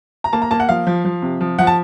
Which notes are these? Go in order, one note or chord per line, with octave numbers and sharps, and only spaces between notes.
A#5
A#3 A5
A#5
A#3 A5
F#5
F3 F5
F3
F3
C3
F3
F3 F#5
A5